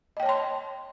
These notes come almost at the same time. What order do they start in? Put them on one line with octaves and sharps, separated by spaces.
D#5 G5 C#5 A5 C6